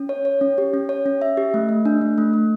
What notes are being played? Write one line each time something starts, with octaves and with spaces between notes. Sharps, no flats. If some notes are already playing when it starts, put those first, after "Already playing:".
Already playing: C#4
C#5
C#5
C#4
G4
C#4
C#5
C#4
E5
G4
A3
A3
D4
A3
A3
A3